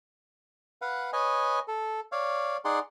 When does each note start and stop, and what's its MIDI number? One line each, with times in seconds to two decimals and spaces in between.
0.82 1.11 71
0.82 1.11 77
0.82 1.11 78
1.13 1.59 71
1.13 1.59 73
1.13 1.59 75
1.13 1.59 80
1.68 2.00 69
2.12 2.57 73
2.12 2.57 74
2.12 2.57 77
2.65 2.79 63
2.65 2.79 68
2.65 2.79 74
2.65 2.79 78
2.65 2.79 84